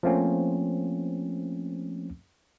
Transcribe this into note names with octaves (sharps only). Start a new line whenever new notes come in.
F3 A3 A#3 C4 C#4